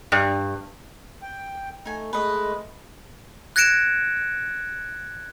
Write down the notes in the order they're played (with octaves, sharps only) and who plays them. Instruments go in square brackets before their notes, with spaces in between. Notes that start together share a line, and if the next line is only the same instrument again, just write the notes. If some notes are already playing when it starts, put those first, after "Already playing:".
[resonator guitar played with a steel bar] G2
[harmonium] G5
[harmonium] A3 [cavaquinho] D#4 G#5
[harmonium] G#3 A3 [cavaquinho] B4 D#5
[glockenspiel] F#6 G#6 A#6 C#7 D7 E7